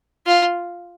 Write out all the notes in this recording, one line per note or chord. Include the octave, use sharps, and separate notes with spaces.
F4